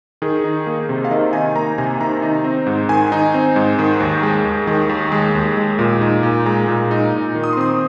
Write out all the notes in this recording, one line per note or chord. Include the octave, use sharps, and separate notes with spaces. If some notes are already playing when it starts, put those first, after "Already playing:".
D#3 G#4
D#4
A#3
C3
F5
D#3 D#5
D#4 G#5
A#3 A#5
C3 G#5
D#3 A#5
D#4
C4
G#2
D#3 G#5
D#4
C4
G#2
D#3
D#2
G#3
D#2
D#3
D#2
G#3
D#2
G#3
A#2
D#4
A#2
G#3 A#5
A#2
D#4
A#2
D#3
D#6
C6
C4 D#6